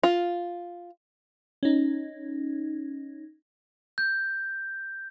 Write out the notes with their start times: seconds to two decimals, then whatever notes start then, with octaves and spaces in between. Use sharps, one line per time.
0.03 F4
1.63 C#4 D#4
3.98 G6